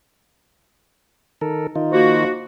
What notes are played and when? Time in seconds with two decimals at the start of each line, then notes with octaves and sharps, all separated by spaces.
1.41 D#3 A4 A#4
1.76 D#3 D#4 F4
1.92 F3 A#3 F#4